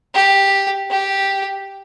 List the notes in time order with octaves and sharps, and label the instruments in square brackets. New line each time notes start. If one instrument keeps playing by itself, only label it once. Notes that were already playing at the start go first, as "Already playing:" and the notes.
[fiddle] G4
G4